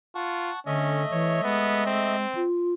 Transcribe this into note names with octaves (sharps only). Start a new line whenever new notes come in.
F4 F#5 A5 C#6
D3 A3 C#4 D#5 E5
E3 C#5
G#3 B3
C4
F4